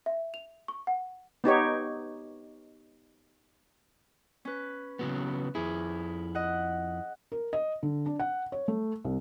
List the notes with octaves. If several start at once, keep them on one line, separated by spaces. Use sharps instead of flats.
E5
F7
C#6
F#5
B3 D#4 G4 C#5
C#4 B4
C#3 F#3 B3
F2 E4 G#4
D#5 F#5
A#4
D#5
D3
D4
F#5
C#5
A3
C2